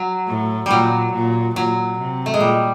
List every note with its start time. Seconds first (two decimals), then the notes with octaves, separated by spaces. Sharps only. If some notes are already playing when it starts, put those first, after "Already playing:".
Already playing: F#3
0.28 A2
0.66 A#2 F#3 G3
1.14 A#2
1.55 A#2 F#3
1.99 C3
2.26 A3
2.34 G#3
2.40 A#2 G3